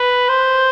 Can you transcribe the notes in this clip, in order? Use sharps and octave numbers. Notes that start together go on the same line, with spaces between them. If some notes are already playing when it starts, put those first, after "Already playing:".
Already playing: B4
C5